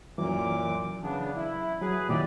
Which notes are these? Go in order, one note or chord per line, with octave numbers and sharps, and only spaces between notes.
F#2 A#2 E3 F#3 D6
C#3 B3 D4
E4
F#3 G#4 B4
A#2 D#3 F#3 E4 G4 D5